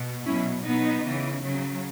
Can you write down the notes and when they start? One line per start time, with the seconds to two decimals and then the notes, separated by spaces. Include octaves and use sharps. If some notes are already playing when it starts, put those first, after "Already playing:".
Already playing: B2
0.26 B2 F#3 C#4 E4
0.65 B2 F#3 B3 D#4
1.04 C#3 E3
1.43 C#3 F#3